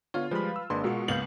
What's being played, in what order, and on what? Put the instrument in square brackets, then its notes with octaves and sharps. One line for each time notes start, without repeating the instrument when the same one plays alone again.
[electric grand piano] D3 [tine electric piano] B3 C#5 [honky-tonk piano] F4
[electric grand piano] F3 G3 G#3 [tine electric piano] B4 B5
[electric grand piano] E6
[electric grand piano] G#1 B4 C6 [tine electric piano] G#3 A#3 D4
[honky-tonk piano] B2 [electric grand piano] G#3 [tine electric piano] F4 F#4 A#4
[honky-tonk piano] C#2 B3 F#7 [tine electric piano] A#3 F5 G6